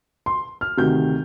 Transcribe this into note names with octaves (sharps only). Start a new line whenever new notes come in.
C6
F6
D2 C3 D#3 G6